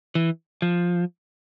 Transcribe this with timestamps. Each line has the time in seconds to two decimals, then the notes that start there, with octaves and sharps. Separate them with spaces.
0.15 E3
0.62 F3